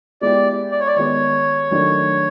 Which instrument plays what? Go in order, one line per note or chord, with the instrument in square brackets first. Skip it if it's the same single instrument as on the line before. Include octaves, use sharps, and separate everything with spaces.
[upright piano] G#3 B3 E4 G4 [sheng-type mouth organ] D5
[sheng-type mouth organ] D5
C#5
D5
[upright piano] D#3 G#3 B3 [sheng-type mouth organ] C#5
[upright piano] D#3 F#3 A3 D4